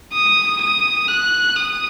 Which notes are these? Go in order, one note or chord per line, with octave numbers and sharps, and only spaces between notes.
D#6
D#6
F#6
D#6